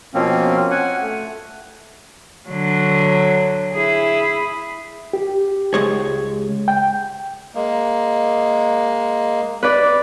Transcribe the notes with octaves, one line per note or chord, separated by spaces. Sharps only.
B2 F3 A#3 C4 C#4
F#5 G#5
A3
D3 F#3
E4 G#4
G4
C#2 G#3 C#5
G5
G#3 A#3
B4 D5